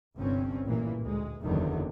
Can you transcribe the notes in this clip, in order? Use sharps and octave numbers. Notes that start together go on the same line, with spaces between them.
G1 C2 G2 C4 C#4
A1 A#2 E3 A#3
D2 G#3
F#1 E2 D3 D#3 F#3